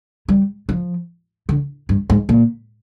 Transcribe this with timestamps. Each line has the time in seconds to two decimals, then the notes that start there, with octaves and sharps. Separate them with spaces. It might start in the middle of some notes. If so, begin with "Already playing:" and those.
0.28 G3
0.69 F3
1.49 D3
1.89 G2
2.10 G#2
2.29 A#2